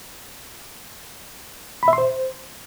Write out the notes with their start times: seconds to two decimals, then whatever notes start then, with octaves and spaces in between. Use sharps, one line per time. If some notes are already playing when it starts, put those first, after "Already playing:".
1.83 B5
1.88 E5
1.93 C6
1.98 C5